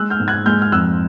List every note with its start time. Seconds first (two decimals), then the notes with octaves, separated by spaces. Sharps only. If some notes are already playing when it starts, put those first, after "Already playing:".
Already playing: G#3 E6 F#6
0.10 F6 G6
0.20 G#2
0.28 F#6 G#6
0.46 G#3 F6 G6
0.62 F6
0.72 F2 E6 F#6